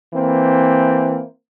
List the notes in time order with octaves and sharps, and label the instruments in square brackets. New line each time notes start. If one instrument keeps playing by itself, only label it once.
[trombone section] E3 A#3 C4